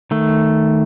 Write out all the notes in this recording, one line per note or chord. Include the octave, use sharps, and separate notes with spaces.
D#3 A3